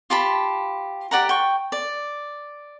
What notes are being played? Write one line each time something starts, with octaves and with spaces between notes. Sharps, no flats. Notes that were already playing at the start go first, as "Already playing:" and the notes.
F4 G4 A5 B5
G4 D5 F#5 A#5
G5 C#6
D5